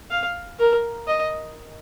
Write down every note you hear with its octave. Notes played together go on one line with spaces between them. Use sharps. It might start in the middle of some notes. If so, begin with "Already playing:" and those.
F5
A#4
D#5